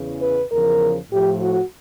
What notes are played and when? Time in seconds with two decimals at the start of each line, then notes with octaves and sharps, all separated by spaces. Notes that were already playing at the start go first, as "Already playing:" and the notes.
Already playing: E2 C#3 E3
0.22 B4
0.52 E2 C#3 F3 A#4
1.12 A2 F3 G4
1.41 F#4